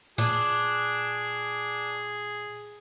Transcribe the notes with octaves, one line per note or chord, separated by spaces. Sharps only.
A#2 D4 G#4